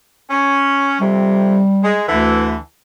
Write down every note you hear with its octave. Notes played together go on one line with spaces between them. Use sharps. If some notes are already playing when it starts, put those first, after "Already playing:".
C#4
F2 C3 G3
G#3
D2 D3 E3